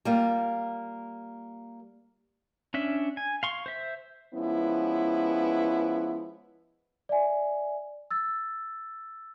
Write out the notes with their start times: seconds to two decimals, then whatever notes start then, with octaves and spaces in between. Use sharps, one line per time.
0.05 G3 A#3 F4
2.74 C#4 D4 E5
3.17 G#5
3.43 F5 C6 C#6
3.66 C5 E5
4.33 F3 G#3 B3 C#4 E4
7.09 D5 E5 G#5
8.11 E6 A6